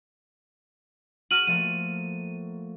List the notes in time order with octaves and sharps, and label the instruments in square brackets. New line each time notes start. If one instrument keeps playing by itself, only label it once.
[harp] F#4 [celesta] F6 D#7 F#7
[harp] F3 A3 A#3 [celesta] D#7